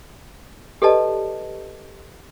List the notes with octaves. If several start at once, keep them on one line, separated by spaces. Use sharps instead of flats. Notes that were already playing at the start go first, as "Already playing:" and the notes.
G4 A4 B4 D5 D#5 A5